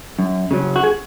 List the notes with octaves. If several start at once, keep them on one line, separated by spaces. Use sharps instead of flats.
F#2
C#3 F#3
F#4
G#4